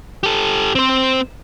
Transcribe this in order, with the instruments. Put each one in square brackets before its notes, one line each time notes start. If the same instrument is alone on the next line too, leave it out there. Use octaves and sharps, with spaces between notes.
[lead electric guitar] G4 A4
C4 C5